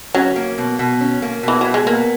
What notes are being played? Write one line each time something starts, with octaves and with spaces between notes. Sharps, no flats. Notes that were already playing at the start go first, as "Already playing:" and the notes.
F#3 C#4
A#3
B2
B2
C#4
A#3
B2 E3
B2 F#3
G#3
A#3 B3